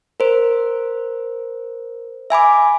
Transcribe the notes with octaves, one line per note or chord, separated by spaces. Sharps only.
A#4 C5
E5 G#5 B5 D6